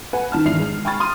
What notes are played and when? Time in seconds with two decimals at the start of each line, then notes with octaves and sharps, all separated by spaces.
0.13 B4 F#5 G#5
0.32 D#3 A5 F6
0.45 G#1 E2 D4 E4 C7 F7
0.59 G#3
0.85 G5 G#5 B5 C#6 F6 A6
1.00 C6 D#6 F6 D#7